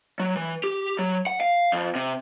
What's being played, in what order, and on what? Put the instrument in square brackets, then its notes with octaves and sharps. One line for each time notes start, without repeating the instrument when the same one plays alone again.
[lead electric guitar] F#3
E3
G4
F#3
F#5
F5
F2
C3